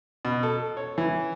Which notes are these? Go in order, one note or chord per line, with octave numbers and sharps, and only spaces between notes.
B2
A4
C#5
E3